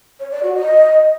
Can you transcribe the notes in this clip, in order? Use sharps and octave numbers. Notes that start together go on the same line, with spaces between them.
C#5
D5
F#4
D#5